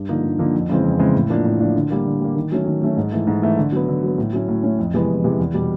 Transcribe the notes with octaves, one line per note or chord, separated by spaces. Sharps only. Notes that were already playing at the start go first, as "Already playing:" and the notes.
Already playing: G2
D3 F3 A#3 D#4
G2
D3 F3 A#3 D#4
F2
C#3 E3 G#3 C4
F2
C#3 E3 G#3 C4
A2
F3 A#3 D4
A2
F3 A#3 D4
D3
G3 A#3
D3
G3 A#3
D#3
F#3 A3 C#4
D#3
F#3 A3 C#4
G#2
E3 A3
G#2
E3 A3
D3
F#3 B3
D3
F#3 B3
A2
F#3 A3 C#4
A2
F#3 A3 C#4
F2
C3 E3 G#3 B3
F2
C3 E3 G#3 B3
E2
B2 G3